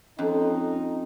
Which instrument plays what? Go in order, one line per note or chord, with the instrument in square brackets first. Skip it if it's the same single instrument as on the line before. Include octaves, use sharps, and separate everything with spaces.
[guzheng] F2 [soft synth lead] C#4 [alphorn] D#4